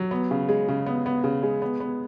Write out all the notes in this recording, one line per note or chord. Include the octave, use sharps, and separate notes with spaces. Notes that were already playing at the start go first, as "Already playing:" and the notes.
Already playing: F#3
B3
C#3
G#3
C#3
B3
B3
C#3
G#3
B3
B3